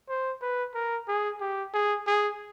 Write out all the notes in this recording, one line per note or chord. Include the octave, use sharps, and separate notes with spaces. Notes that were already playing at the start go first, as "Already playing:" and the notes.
C5
B4
A#4
G#4
G4
G#4
G#4